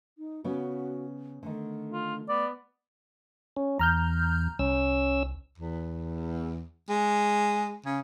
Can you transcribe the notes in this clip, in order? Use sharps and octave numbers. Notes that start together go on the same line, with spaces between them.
D#4
C#3 B3 C#4 F#4
D3 D#3 A3
F4
B3 D5
C#4
E2 A#5 F6 G6
C2 C#4 E6
E2
G#3
C#3